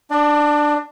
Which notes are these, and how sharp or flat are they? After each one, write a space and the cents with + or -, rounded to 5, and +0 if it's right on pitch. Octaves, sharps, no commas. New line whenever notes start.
D4 +10 D5 +35